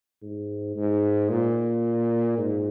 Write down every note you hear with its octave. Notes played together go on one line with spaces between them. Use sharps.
G#2
G#2
A#2
G#2